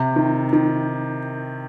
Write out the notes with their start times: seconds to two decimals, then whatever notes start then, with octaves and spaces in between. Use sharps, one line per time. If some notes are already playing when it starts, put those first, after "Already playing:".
Already playing: C3
0.16 D#3
0.53 D#3